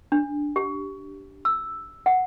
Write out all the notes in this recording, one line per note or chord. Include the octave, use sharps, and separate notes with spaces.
D4
G4
E6
F#5